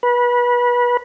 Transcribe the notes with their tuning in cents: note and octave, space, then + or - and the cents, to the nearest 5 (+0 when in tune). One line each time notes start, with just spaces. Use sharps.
B4 -25